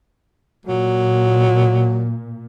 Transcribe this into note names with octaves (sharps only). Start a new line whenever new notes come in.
A#2 F#3